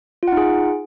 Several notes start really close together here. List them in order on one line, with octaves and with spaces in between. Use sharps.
F4 F#5 D#4 G#4